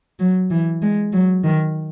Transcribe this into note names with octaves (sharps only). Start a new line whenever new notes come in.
F#3
E3
G#3
F#3
D#3